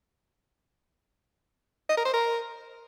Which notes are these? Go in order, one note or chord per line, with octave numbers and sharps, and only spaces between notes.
D#5
A#4
C5
A#4